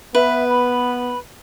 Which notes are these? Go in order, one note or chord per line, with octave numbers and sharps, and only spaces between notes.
B3 B4 E5
B5